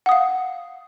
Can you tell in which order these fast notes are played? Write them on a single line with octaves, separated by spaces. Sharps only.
F#5 D#6 F5